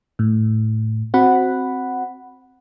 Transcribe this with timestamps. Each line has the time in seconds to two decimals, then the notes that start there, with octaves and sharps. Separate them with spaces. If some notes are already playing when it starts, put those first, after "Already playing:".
0.19 A2
1.14 C4 F#4 F#5 B5